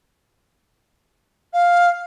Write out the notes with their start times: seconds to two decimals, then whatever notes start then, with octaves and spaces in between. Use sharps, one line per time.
1.53 F5